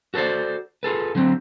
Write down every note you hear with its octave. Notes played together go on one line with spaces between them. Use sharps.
F#4 A4 A#4 C5 D5
F4 G#4 A4 B4
D3 F#3 C4